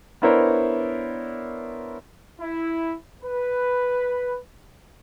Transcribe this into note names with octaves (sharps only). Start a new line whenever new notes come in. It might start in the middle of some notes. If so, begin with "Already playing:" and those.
B3 D4 E4 A#4 C5 C#5
E4
B4